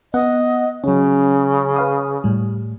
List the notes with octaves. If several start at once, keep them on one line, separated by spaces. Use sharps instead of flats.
B3 D#5 F#5
C#3 F#3 C#4
B4 F5 D#6
A2 G3